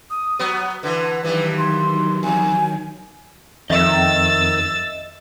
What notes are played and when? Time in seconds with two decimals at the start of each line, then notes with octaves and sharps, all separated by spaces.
0.10 D#6
0.39 F#3 B3
0.83 D3 E3 B4 B6
1.23 G2 D#3 E3 F#3 G3 B4
1.58 C6
2.23 E2 G#5
3.70 F2 D#3 D#5 E5 E6 A6